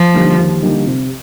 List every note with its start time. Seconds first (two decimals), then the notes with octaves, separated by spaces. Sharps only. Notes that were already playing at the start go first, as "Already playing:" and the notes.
Already playing: F3
0.14 D3 G3 A#3 D#4
0.38 D#2
0.62 D3 G3 A#3 D#4
0.86 C3